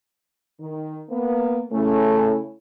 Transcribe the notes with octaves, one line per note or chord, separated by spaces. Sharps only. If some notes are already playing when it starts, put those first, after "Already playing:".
D#3
A#3 B3
C#3 A3 C#4 E4